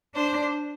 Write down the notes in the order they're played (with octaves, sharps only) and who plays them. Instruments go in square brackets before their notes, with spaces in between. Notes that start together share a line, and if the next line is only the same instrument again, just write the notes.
[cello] D4 [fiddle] C5